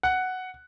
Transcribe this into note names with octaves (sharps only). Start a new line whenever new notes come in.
F#5